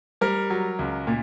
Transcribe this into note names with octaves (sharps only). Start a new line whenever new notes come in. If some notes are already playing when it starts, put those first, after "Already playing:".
G3 A#4
F#3
C#2
A#2